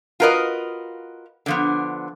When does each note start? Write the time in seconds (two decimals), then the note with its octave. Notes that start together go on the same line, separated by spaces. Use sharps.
0.20 F4 F#4 A#4 B4 D#5
1.46 D3 F3 B3